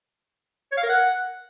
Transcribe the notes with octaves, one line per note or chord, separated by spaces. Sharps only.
C#5
F5
A#4
F#5